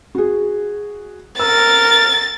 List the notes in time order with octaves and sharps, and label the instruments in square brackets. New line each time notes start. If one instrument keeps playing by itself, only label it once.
[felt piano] F#4 G#4
[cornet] A#4 [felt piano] E6 [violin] A6